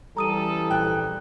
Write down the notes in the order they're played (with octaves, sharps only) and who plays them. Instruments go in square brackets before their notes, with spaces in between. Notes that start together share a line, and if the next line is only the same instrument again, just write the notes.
[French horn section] C#3 E3 G3 [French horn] A4 [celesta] A#5 D#6 D#7
[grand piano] A#1 G5 F#6